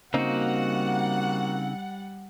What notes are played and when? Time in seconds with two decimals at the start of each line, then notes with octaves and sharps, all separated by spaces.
0.14 C#3 G3 A#3 C4 D#4 F#4 F#5